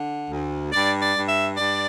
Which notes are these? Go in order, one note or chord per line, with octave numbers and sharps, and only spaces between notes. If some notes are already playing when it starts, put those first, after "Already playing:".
Already playing: D3
D2
G2 D5
D5
G2
E5
G2 D5